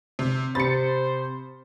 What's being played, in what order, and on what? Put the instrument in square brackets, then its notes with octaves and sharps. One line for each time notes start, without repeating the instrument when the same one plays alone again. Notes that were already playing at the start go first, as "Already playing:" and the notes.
[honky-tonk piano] C3
[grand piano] C3 B5 [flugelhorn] C5 [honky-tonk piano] A6 C#7